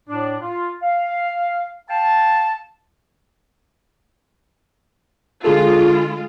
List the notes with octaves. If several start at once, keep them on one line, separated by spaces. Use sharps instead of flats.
A2 D4
F4
F5
F5 G5 A5
D3 G#3 F4 G#4 A4